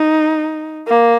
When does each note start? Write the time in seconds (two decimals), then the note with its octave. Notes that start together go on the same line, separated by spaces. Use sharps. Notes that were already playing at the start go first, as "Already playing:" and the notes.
Already playing: D#4
0.88 A#3